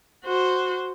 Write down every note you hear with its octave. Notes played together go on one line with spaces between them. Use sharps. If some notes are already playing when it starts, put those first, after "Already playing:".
F#4 C5